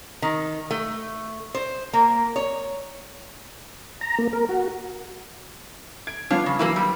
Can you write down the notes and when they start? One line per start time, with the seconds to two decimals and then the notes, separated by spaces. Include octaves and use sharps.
0.22 D#3
0.71 A3
1.55 C5
1.93 A#3
2.36 C#5
4.01 A#5
4.18 A#3
4.33 A#4
4.49 F#4
6.07 G#6 D7
6.30 F3 B3 D4 F4 C#5 F5
6.46 C#3 C#6
6.59 E3 F#3 A#3 E4 B4 D#7
6.76 G3